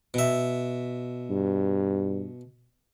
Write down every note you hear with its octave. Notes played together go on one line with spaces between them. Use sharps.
B2 E5
G2